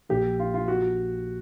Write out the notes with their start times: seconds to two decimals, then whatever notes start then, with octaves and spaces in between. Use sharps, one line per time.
0.10 A#1 A#2 F3 A#3 G4
0.39 F4
0.54 F4
0.68 F#4